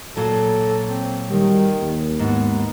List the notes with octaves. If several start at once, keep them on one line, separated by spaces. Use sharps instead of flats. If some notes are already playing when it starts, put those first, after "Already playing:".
A#2 F#3 A4
C4
D#3 G3
D#2
G#2 B3